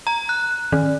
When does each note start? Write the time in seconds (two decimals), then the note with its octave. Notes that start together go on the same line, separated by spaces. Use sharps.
0.07 A#5
0.29 F#6
0.72 D#3